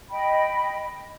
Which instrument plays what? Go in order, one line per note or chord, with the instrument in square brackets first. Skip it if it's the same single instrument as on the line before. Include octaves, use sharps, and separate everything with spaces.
[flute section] D#5 G5 B5